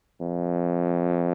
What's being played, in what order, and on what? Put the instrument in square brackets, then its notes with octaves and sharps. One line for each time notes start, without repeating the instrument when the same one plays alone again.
[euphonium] F2